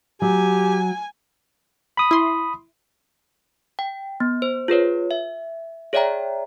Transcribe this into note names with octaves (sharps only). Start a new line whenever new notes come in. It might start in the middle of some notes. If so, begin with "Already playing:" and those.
F#3 G4 G#5
B5 D#6
E4 C6
G5
B3
C5
F4 G#4 B4 C#5
E5
G#4 C#5 D5 E5 G5 A#5